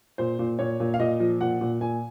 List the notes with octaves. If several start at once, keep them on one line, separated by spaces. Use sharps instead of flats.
A#2 C5
A#2
A#2 C#5
A#2
F5
A#2 D#5
F3
A#2 F#5
A#2
A#2 G#5